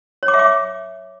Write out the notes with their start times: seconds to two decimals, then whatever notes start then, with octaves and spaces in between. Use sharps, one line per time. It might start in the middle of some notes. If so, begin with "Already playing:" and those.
0.23 C#5
0.28 D6
0.34 E5
0.39 D6